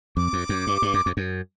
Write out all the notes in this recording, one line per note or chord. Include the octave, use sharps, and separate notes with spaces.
F2 D6
F2
F#2
G2
G2
F#2
F2
F#2